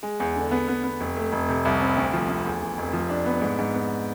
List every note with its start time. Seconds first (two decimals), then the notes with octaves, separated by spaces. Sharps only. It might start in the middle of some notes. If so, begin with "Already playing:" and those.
0.03 G#3
0.20 E2
0.36 D3
0.51 B3
0.68 B3
0.84 B3
1.01 F1
1.17 A3
1.33 F1
1.49 C3
1.65 C2
1.81 C4
1.97 D2
2.13 F3
2.29 D2
2.46 E2
2.62 E2
2.78 F1
2.93 F3
3.10 D4
3.26 B3
3.42 G#2
3.59 G#2
3.74 B3